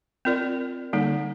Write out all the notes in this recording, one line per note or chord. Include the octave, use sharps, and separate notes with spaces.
C4 F4 A#4 D5
D3 G3 A#3 D#4